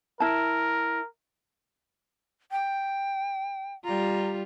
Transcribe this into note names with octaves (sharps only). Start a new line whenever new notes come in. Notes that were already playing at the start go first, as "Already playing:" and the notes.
E4 A#4 E5 A5
G5
G3 F4 A#5